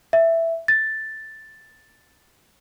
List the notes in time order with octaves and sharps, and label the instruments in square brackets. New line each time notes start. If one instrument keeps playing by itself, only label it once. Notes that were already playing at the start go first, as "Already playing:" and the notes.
[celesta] E5
A6